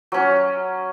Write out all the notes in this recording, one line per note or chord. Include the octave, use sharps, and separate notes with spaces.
F#3 C#4